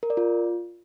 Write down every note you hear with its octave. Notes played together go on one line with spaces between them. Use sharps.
A#4
D5
F4